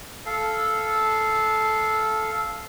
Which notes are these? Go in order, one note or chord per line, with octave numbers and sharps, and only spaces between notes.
A4 F5